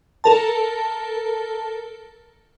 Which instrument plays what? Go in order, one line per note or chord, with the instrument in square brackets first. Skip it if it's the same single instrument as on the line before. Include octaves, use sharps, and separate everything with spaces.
[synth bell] A4 A#4 A5